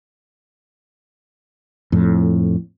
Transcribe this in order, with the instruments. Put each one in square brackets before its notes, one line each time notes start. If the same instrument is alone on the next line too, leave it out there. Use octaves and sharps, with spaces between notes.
[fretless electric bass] F2 A2